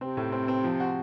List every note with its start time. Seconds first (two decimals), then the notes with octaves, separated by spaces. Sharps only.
0.01 C3 C4
0.17 A2
0.32 C4
0.48 C4
0.64 F3
0.80 F#4